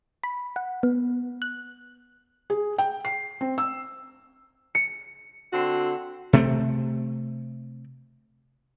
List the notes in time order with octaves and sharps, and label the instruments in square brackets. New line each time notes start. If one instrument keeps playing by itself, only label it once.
[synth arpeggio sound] B5
F#5
B3
F#6
[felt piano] G#4
G5
C7
C4
E6
[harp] C#7
[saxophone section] D3 C4 F#4
[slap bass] C3 A3 C4